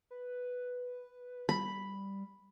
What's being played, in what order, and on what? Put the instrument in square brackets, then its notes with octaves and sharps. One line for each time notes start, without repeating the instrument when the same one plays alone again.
[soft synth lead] B4
[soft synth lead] G3 [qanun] B5